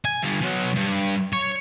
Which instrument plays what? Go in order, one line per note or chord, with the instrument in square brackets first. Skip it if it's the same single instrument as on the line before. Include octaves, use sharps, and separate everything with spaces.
[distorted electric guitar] G#5
G2 D3
B2 F#3
G2
C#5